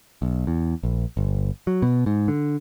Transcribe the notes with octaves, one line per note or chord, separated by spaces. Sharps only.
B1
E2
A#1
G1
F#3
B2
G#2
D3